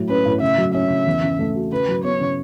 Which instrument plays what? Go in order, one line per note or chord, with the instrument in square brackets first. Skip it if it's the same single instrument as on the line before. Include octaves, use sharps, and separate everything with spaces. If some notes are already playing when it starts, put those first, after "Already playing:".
Already playing: [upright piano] A2 F#3
[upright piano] C#4 [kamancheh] B4
[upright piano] A2
[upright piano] C#3 [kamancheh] E5
[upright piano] F#3
[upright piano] C#4 [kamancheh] E5
[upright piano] C#3
E2
C#3
A3
F#4
[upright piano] C#3 [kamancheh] B4
[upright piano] F#3
[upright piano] B3 [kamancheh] C#5
[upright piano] C#3